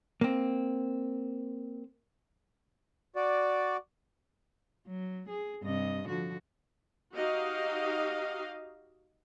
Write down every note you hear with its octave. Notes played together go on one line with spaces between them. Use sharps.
A#3 C4
F#4 D5
F#3
G#4
G2 C3 D#5
D3 F3 F#4
D#4 F#4 G4 D#5 F5